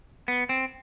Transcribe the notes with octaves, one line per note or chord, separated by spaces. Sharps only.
B3
C4